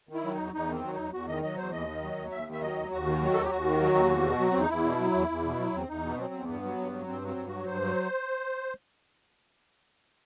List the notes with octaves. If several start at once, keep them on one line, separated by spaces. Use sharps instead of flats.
D#3
E4
F#3
E2 D#4
E2 D#4
D#3
C4
F#3
E2 D#4
E2 F#4
D#3 D#5
F#3 D#5
E2 C5
D#2 D#5
D#3
F#3
D#2
D#2 E5
D#3
E5
F#3 D#5
D#2
D#2 F#4
D#3
F#3
D#2 A4
G4
D#2 F#4
D#3
F#3
D#2
E2
B2
F#3
E2 C4
D#4
E2 E4
B2
F#3
E2
E2
B2
F#3
E2 C4
E2 D#4
B2 B3
F#3 C4
E2
G2 B3
F#3
G2
F#3
G2 C4
F#3
C4
G2
F#3 F#4
G2 C5
F#3